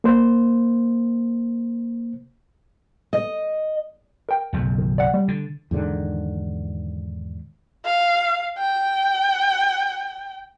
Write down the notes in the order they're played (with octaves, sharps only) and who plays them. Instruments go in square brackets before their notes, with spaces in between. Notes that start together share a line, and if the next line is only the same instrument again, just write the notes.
[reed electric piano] A#3 C5
[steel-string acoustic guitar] D#5
[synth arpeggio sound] A#4 G5
[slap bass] F#1 B1 F#2
[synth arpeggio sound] D#3
D5 F#5
G3
[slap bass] D3
[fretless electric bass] E2 G#2 D3 D#3
[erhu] F5
G5